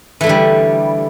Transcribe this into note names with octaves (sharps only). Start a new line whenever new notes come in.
D3 E3 G3 A3